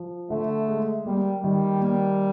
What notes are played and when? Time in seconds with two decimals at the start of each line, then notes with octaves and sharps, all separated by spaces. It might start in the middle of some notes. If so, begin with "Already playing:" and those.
Already playing: F3
0.30 D3 A3
0.68 G#3
1.06 G3 A#3
1.44 D#3 G3
1.81 A#3